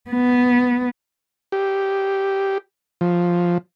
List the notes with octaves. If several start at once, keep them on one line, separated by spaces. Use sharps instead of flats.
B3
G4
F3